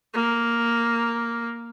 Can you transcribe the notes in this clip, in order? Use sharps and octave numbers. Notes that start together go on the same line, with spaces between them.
A#3